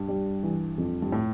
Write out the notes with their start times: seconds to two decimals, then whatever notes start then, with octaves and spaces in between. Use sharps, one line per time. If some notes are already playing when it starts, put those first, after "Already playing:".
Already playing: G2
0.08 G3
0.43 E3
0.78 F2
1.02 G2
1.12 A2